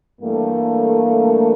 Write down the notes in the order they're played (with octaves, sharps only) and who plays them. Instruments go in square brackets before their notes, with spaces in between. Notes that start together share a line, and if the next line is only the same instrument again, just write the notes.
[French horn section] G2 E3 A3 [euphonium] A#3